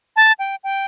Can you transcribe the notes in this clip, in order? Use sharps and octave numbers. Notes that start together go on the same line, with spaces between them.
A5
G5
G5